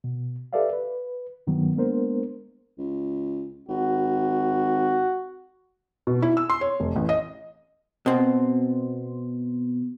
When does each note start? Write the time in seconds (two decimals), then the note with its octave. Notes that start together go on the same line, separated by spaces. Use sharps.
0.04 B2
0.53 G4 A4 B4 D5 E5 F5
0.73 B4
1.47 G2 D#3 F#3 B3
1.75 G#3 A#3 B3 D4 A#4 C5
2.78 C#2
3.68 G#1 F#4
6.07 B2
6.22 E4
6.37 E6
6.50 C6
6.61 C#5
6.80 F1
6.96 A1
7.09 D#5
8.06 B2 C4